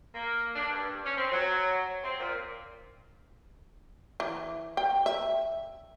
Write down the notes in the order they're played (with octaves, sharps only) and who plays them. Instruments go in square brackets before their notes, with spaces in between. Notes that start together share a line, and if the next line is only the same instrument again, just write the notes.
[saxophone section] A#3
D4
G2
C#4
C4
F#3
C4
A#2
[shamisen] E3
G5
E5